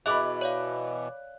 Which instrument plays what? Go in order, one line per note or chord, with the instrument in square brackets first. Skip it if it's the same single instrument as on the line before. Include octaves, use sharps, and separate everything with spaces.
[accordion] B2 E3 [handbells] G#4 D#5 E5 [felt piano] B5 D6 F#6
[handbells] C#5 D5 F5